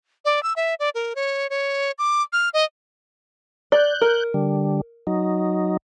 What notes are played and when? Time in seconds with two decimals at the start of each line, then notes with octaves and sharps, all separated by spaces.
0.25 D5
0.43 E6
0.56 E5
0.80 D5
0.95 A#4
1.15 C#5
1.50 C#5
1.99 D6
2.33 F6
2.54 D#5
3.72 D5 F#6 G6
4.01 A#4
4.34 D3 G3
5.07 F#3 D#4